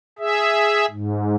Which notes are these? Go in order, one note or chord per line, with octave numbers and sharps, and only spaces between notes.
G#4 E5
G#2